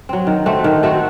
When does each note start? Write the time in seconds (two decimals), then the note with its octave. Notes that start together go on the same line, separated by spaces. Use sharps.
0.09 F#3 C4
0.27 D#3
0.46 A3 C4 F#4
0.64 D#3
0.83 A3 C4 F#4